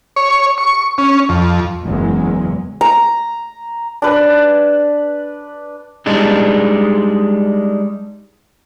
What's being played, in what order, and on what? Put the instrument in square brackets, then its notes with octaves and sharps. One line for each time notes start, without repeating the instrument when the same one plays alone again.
[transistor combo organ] C#5
C#6
C#4
F2
[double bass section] F#1 E2 F#3 G#3
[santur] A#5
D4 B4
[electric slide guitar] G3 G#3 D4 D#4